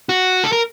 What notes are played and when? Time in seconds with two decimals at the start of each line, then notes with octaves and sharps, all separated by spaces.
0.09 F#4
0.44 A4
0.52 A#4